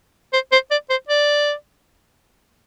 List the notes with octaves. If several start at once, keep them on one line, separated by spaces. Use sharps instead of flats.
C5
C5
D5
C5
D5